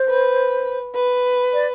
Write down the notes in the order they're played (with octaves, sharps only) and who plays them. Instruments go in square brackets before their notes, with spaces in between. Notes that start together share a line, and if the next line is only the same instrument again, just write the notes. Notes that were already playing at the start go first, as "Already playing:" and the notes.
Already playing: [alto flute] C5
[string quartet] B4
B4
[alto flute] D5